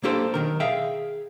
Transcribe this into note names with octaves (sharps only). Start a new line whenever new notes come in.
A#3 D4 G4 A4 C5
B1 D#3 A#4
G#4 E5 F5 G5